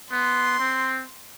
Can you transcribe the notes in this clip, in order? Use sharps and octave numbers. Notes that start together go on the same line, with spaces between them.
B3 C6
C4